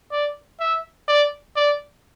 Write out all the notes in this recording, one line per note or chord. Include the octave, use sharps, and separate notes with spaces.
D5
E5
D5
D5